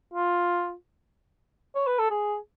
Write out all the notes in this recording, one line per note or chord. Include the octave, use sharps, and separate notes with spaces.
F4
C#5
B4
A4
G#4